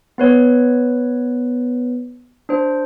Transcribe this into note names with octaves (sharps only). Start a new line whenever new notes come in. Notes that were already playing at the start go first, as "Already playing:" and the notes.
B3 B4 C#5
D4 C5